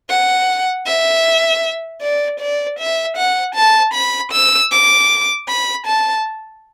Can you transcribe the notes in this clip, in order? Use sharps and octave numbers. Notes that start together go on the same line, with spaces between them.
F#5
E5
D5
D5
E5
F#5
A5
B5
E6
D6
B5
A5